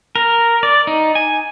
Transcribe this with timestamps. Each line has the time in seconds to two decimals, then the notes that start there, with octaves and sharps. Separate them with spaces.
0.16 A#4
0.63 D5
0.87 D#4
1.15 G#5